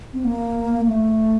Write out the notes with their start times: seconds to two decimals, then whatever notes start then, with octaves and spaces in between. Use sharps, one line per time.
0.13 C4
0.24 A#3
0.87 A3